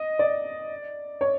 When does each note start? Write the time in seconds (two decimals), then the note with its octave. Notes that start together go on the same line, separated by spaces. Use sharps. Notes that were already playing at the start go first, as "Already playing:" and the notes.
Already playing: D#5
0.19 D5
1.21 C#5